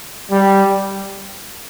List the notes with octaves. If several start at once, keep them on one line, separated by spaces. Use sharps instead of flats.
G3